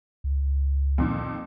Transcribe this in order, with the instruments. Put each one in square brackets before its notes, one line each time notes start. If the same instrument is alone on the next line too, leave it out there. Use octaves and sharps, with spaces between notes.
[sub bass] C#2
[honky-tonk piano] F2 A#2 D#3